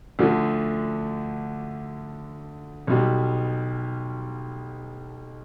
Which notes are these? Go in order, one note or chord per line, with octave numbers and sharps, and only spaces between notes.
D2 D3 F3
B1 B2 G3